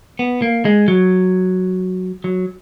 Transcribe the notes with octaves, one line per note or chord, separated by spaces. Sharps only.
B3
A#3
G#3
F#3
F#3